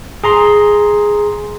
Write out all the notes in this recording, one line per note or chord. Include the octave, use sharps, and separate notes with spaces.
G#4 A#5 C6